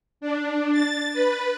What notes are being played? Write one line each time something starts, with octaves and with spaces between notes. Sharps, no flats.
D4
A6
B4